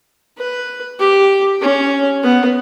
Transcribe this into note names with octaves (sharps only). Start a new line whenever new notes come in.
B4
G4
C#4
B3